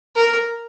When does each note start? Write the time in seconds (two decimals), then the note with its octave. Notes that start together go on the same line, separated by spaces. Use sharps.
0.16 A#4